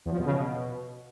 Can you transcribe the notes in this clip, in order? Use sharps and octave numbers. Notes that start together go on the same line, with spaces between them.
E2
F3
B2
C#3
B2